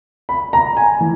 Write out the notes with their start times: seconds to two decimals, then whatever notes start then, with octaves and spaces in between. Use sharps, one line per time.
0.29 B5
0.53 A#5
0.77 G#5
1.00 E3